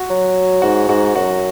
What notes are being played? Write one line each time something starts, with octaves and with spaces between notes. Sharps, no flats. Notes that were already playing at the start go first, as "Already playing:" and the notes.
Already playing: F#4
F#3
G#2 F#4
G#2 F#4
F#2 F#4